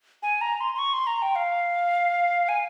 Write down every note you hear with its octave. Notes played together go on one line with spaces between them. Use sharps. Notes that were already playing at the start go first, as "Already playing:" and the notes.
G#5
A#5
C6
C6
C#6
C6
A#5
G5
F5
G#5